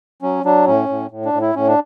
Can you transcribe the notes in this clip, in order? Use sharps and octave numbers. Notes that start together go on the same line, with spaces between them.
F#3 C#4
F#3 D4
A2 C#4
A2
A2
D4
A2
E4
A2 C#4
D4